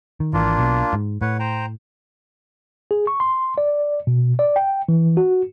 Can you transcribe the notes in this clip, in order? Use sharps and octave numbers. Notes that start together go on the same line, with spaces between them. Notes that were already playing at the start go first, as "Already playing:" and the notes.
D#3
G#1 E3 A#3 D4 F4
B1 B2
G#2
A2 B4 C#5 F#5
C5 G5 A#5
G#4
C#6
C6
D5
B2
D5
G5
E3
F#4